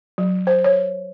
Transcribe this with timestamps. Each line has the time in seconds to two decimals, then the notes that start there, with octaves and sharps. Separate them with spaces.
0.18 F#3
0.47 C5
0.64 C#5